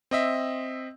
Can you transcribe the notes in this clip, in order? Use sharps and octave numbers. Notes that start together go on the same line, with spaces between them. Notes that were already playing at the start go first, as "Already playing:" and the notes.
C4 D#5 E5